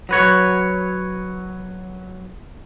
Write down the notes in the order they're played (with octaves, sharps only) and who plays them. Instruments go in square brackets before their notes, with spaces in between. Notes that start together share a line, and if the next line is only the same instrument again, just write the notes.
[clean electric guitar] F#3 B4 C#5